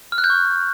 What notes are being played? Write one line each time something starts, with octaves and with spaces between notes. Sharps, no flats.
F6
F#6
G6
C#6